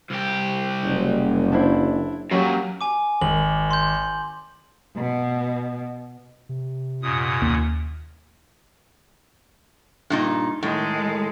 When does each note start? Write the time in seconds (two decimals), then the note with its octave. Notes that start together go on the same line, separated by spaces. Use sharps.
0.11 C2 G4
0.83 F#1
1.52 D4 E4 C5
2.31 F#2 A#2 F#3 C#4 G4
2.81 G#5 D6
3.21 G#1 F#7
3.71 C6 G6
4.96 B2
6.49 C3
7.02 F#2 A#2 D#6
7.42 D#2
10.10 G2 A#2 D#4
10.63 A2 D#3 G#3